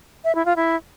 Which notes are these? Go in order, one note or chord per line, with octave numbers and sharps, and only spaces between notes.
E5
E4
F4
E4